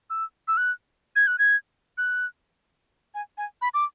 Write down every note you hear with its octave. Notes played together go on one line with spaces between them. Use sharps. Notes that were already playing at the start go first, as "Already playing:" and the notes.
E6
E6
F#6
G#6
F#6
G#6
F#6
G#5
G#5
B5
D6